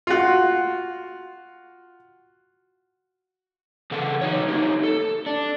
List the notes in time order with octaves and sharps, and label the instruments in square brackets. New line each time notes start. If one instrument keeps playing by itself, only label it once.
[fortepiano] F4 F#4
[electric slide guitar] C#3 E3 A4 F#5
F#3 D#4 C#5
A3 D#4 G4
A4
D4